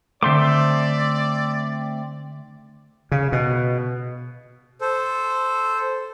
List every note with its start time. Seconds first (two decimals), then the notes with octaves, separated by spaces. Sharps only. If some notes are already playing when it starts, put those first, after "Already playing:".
0.23 D3 A3 C4 D5 E5 C6 D6 G6
3.12 C#3
3.32 B2
4.81 A4 C5